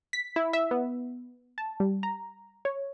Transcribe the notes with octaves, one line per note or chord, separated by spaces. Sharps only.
B6
E4
E5
B3
A5
G3
A#5
C#5